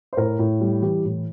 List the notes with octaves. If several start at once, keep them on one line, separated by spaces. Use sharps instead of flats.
C5
A2 A#4
A2
G3
E3 G4
A2